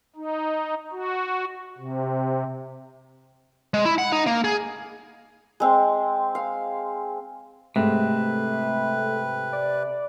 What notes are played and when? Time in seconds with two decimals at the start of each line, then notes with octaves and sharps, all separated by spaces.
0.15 D#4
0.92 F#4
1.78 C3
3.74 G#3
3.85 E4
3.98 F#5
4.12 D#4
4.27 A#3
4.44 G#4
5.60 G#3 C4
6.35 F5
7.76 G#2 C3 A3 B4
9.53 D5